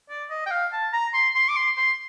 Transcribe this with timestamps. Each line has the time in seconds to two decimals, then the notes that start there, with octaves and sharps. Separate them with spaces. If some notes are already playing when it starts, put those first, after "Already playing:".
0.10 D5
0.30 D#5
0.46 G5
0.51 F5
0.72 A5
0.93 A#5
1.14 C6
1.35 C6
1.49 D6
1.56 C6
1.77 C6